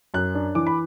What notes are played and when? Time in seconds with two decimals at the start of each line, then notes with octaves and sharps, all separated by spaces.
0.14 F#2 F#6
0.35 D4
0.55 E3 D6
0.67 B5